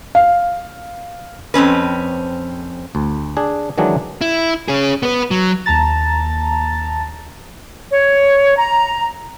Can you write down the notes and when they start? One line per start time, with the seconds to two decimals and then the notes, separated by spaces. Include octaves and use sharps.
0.15 F5
1.54 F2 C4 C#4 B4
2.95 D2
3.37 D4 G#4
3.78 D#3 E3 F#3 G#3 D4 G#4
4.21 E4
4.68 C#4 G#4
5.03 B3 B4
5.31 F#3
5.66 D#2 A5 A#5 A6
7.90 C#5
8.57 A#5